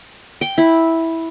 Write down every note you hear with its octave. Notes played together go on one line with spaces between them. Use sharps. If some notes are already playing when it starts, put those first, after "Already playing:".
G5
E4